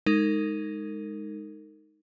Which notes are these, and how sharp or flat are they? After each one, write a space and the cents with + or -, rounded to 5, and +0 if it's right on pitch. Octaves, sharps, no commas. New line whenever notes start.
G#3 +0 D#4 +0 A#4 -40